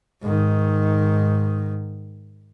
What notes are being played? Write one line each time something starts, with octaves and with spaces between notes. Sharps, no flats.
G#2 D#3